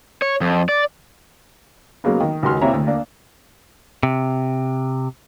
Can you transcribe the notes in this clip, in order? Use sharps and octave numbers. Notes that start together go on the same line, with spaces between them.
C#5
F2
D5
C#3 F#3 G#3 A#3 B3
D#3
C#2 D#3 F#4 C6 F6
C3 A#3 E4 C#5 E5 A#5
D2
A#3 D4
C3